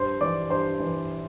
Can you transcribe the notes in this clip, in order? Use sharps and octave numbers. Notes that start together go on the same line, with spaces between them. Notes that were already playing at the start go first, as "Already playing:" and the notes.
Already playing: G2 C5 C6
E3 D5 D6
G2 C5 C6
E3